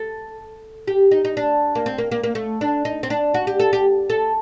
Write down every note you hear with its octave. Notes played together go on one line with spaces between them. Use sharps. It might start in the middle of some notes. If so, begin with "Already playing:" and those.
Already playing: A4
G4
D#4
D#4
D4
A#3
C4
A#3
A#3
A#3
A3
D4
D#4
C4
D4
F#4
G4
A4
G4
A4